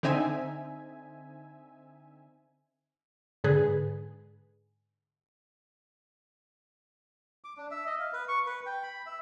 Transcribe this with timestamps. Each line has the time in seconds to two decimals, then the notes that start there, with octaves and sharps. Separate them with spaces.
0.03 D3 C4 D#4 E5 G#5
3.44 G#2 D3 G#4 B4
7.44 D6
7.57 D4
7.71 E5
7.87 D#5
7.99 F5
8.13 B4
8.28 C#6
8.46 B4
8.66 G5
8.83 B5
9.06 E5